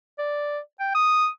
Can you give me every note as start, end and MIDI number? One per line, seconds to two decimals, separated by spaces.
0.19 0.59 74
0.80 0.93 79
0.95 1.27 87